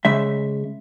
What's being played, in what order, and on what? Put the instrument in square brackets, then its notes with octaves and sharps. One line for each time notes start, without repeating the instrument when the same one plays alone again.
[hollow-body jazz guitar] C#3 G#3 E5